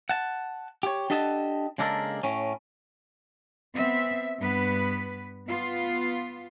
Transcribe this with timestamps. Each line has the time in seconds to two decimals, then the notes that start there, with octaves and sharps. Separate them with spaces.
0.09 F#5 A5
0.83 G4 C#5
1.10 D4 G4 A4 D#5 F#5 A5
1.78 C#3 G#3 A#3 D4 A4 A#4
2.23 A2 C#4
3.74 B3 C4 E5
4.38 G2 B3 B4
5.47 B3 F4